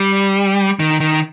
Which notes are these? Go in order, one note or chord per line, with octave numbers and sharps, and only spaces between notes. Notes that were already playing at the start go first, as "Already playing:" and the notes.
Already playing: G3
D#3
D#3